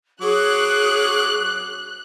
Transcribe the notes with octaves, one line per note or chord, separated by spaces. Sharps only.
F#3 G#4 C#5 D6 F#6